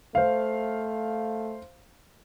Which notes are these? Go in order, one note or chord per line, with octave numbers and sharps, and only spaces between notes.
A3 C5 F5